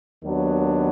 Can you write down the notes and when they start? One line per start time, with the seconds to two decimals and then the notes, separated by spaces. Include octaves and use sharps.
0.22 D#2 D#3 F#3 B3 D4